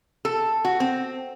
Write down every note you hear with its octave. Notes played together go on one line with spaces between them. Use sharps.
A4
F#4
C4